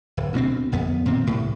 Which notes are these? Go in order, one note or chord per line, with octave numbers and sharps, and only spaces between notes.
D1
D2 B2 B3 C4
G1 F2 B3
A#2 D#3 C4
C2 A2